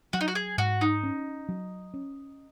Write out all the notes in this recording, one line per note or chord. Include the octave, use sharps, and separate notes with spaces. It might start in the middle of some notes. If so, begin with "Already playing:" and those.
F#3 F#4
D#4
F#4
G#4
G#2 F#4
D#4
C#4
F#3
C#4